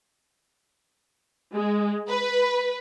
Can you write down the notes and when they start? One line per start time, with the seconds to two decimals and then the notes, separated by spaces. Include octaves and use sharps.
1.54 G#3
2.08 B4